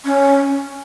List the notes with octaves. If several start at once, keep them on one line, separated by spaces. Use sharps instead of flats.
C#4